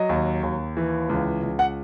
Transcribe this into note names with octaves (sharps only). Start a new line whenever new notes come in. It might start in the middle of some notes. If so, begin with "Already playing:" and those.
Already playing: F#3 D#5
D#2
D#2
E3
C#2
C#2
F#5